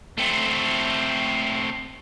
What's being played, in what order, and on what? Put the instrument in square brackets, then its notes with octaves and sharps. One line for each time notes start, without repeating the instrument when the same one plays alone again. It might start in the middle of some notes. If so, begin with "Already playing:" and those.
[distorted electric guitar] A3 C4